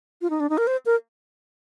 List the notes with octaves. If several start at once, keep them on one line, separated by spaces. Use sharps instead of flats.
F4
D#4
D4
D#4
A#4
C5
A#4